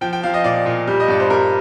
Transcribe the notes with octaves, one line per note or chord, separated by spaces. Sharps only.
F3 G5
G5
F3 F5
D#5
A#2 D5
A#2
G3
D#5
G2 D5
C5
G3 A#4